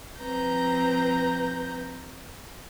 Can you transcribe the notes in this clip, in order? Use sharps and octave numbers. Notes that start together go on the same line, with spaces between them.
F3 C4 B4 A#5 G6